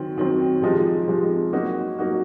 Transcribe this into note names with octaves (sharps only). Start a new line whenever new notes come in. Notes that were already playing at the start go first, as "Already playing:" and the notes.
Already playing: D#3 F#3 C4
D#3 F#3 C4
C3 F3 G#3 D#4
C3 F3 G#3 D#4
F#3 A#3 D#4 F#4
F#3 A#3 D#4 F#4